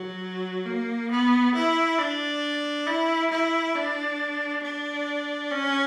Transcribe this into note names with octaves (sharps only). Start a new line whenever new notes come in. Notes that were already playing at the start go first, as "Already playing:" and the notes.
Already playing: F#3
A#3
B3
E4
D4
E4
E4
D4
D4
C#4